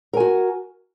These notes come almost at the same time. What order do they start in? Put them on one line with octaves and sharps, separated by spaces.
A#4 G#5 F#4